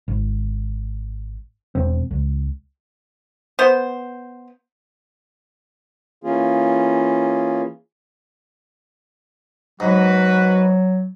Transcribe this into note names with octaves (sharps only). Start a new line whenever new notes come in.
G#1
E1 C4
C#2
B3 C5
E3 A#3 C#4 F4 G#4
G#2 F#3 F#4 B4